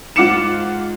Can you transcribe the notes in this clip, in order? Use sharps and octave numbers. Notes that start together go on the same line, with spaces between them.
G#2 F4 F#5 D6 C#7 E7